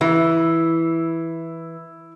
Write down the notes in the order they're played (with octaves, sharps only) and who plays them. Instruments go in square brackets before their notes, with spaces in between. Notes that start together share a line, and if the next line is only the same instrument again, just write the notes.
[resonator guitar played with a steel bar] E3 [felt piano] E4